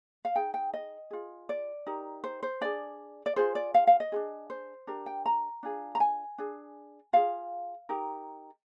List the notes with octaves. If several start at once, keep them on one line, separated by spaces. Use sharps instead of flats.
F5
D#4 G#4 G5
G5
D#5
F4 G#4
D5
D#4 G4 A#4
C5
C5
D4 G#4 D5
D5
F4 G#4 C5
D5
F5
F5
D#5
D4 F4 G#4
C5
D4 G4 A#4
G5
A#5
D4 F4 G#4
A#5
G#5
D4 G#4
F4 G#4 F5
D#4 G4 A#4